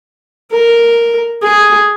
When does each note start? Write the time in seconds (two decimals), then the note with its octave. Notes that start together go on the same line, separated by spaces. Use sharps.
0.52 A#4
1.43 G#4